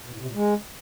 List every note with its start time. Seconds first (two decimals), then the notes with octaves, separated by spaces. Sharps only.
0.06 B2
0.13 A2
0.20 C3
0.27 A#2
0.34 G#3